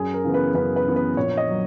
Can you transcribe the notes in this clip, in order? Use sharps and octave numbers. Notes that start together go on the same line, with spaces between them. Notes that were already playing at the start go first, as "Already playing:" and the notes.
Already playing: F#2 G#4
A#4
C#3 E3 B3
B4
F#2 B4
B4
C#3 E3 B3
B4
A#1 C#5
D#5
F#3